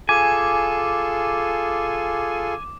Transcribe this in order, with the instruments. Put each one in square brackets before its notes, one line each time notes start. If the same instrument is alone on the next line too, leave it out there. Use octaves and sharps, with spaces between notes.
[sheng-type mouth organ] F4 G#4 A4 [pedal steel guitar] G#5 [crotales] D6